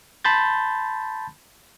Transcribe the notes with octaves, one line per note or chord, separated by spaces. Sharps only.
A5 B5 C6 G6 A6